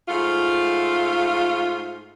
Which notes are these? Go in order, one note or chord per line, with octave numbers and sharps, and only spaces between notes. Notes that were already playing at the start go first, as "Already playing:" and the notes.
G#2 A3 F4